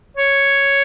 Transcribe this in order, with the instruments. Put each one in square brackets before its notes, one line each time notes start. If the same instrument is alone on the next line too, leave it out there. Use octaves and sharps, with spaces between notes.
[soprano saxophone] C#5